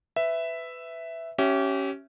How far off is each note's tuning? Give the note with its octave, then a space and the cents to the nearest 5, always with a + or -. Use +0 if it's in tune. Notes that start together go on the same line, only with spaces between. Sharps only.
B4 +20 E5 +0
C#4 +0 G4 -30 E5 +0